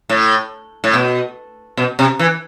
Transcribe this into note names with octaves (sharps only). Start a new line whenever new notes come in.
A2
A2
B2
B2
C3
E3